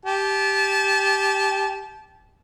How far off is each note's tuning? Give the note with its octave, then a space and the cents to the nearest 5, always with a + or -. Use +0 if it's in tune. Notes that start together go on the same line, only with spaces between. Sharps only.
G4 +0 A5 -30